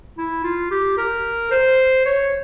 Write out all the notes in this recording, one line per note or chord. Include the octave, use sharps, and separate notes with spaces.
E4
F4
G4
A#4
C5
C#5